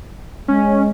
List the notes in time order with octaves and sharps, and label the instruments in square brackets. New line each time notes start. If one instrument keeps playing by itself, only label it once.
[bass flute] G#3 [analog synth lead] C#4